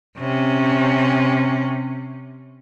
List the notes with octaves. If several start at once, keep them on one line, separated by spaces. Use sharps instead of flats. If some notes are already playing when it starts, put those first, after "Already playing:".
C3 C#4